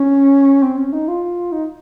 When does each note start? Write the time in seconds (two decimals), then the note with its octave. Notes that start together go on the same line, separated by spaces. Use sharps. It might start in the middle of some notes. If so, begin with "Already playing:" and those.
Already playing: C#4
0.63 C4
0.78 C#4
0.93 D#4
1.08 F4
1.52 D#4